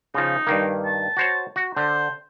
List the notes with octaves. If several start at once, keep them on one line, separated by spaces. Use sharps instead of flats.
C#3 F3 D#4
G2 D#3 A#3
A5
F#4 C5 C#5
F#4
D3 C5